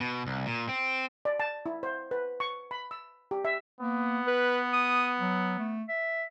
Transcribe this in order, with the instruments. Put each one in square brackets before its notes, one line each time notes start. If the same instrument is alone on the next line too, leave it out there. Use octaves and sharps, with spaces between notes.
[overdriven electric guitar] B2
C2
A#2
C4
[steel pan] D5
A5
E4
C5
B4
C#6
B5
E6
G4
E5
[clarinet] A#3 [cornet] B3
[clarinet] B4
D#6
F#3
A3
E5